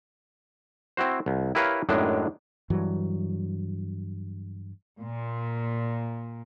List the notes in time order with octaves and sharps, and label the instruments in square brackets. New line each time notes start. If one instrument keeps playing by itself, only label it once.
[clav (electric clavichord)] C4 E4 F#4 C5
C2
E4 G4 A#4 B4 C#5 F5
F#2 A2 D#3 G#3 D4 G5
[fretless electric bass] G2 E3 F#3
[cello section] A#2